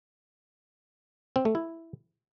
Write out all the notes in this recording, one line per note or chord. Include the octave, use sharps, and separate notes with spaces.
C4
A3
E4